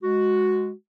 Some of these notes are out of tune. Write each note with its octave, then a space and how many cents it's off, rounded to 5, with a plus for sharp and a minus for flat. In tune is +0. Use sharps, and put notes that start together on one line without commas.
G#3 +0 F#4 +0